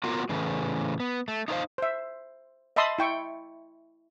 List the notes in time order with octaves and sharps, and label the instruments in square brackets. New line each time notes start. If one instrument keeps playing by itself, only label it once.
[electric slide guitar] B3 F4 F#4 A#4
A2 C#3 E3
B3
A3
D#4 E4 A4 C5 F5
[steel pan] C5 E5
D#5 E5 A5 B5 C6 D#6
E4 G5 C#6